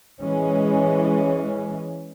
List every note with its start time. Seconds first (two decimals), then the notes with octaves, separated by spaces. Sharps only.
0.20 E3 G#3 C#4